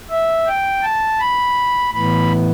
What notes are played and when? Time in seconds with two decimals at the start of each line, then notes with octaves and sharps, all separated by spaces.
0.10 E5
0.47 G5
0.83 A5
1.20 B5
1.93 A2 E3 B3 B5